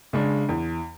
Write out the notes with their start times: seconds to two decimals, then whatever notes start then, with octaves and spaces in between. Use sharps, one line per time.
0.13 C#3 G#3 D4
0.49 E2